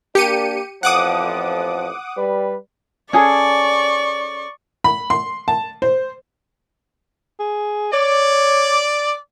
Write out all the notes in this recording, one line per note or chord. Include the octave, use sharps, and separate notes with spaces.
A#3 D4 G4 C#7 D#7
A1 F2 F3 F#5 D6 D#6
G3 B4
C#4 G#4 A4 D5 C#6
B5
C6
A5
C5
G#4
C#5 D5